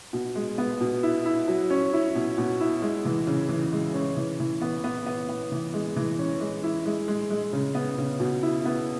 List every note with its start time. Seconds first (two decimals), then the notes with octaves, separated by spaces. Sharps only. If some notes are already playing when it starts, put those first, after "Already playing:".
0.13 B2
0.35 G#3
0.58 B3
0.81 B2
1.03 E4
1.26 E4
1.48 F#3
1.70 C#4
1.93 E4
2.15 B2
2.38 B2
2.60 E4
2.82 G#3
3.05 E3
3.27 C#3
3.49 E3
3.73 G#3
3.94 C#4
4.17 E3
4.40 E3
4.61 B3
4.84 B3
5.06 B3
5.29 B3
5.52 E3
5.74 G#3
5.96 E3
6.19 C#4
6.40 G#3
6.63 E4
6.86 G#3
7.08 G#3
7.30 G#3
7.53 C#3
7.75 B3
7.98 C#3
8.20 B2
8.43 E4
8.65 B3